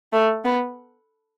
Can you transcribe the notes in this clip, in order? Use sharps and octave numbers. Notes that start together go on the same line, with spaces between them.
A3
B3